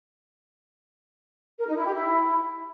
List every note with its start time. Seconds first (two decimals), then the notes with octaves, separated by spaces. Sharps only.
1.59 A#4
1.67 D#4
1.76 E4
1.84 G4
1.93 E4